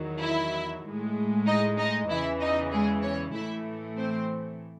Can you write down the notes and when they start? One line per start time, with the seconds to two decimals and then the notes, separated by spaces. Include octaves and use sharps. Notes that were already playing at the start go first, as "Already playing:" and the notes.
Already playing: E2 D#3 F#3
0.21 E4 E5
0.84 A2 G#3
1.47 D#4 D#5
1.78 D#4 D#5
2.09 E2 C#3 E3 E4 E5
2.40 D#4 D#5
2.72 G#3 G#4
3.03 C#4 C#5
3.35 A2 E3 A3 E4 E5
3.97 C4 C5